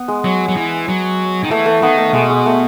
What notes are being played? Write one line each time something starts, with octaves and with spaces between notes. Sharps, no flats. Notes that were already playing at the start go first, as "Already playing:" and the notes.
Already playing: B3
G#3
F#3
F#3
E3
F#3
D#3
E3 A3
A3
D#3 B3
A3
B2 G#3
G#3
A3